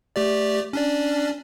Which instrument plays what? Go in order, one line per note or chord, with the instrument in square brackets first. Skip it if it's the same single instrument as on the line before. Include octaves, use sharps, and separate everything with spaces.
[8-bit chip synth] A3 G4 D5
C#4 D4 D5